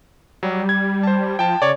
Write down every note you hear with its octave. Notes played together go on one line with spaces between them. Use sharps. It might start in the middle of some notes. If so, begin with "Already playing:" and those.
F#3 G3
G#6
C5 A5
F3 G5 A5
C#3 C#5 D5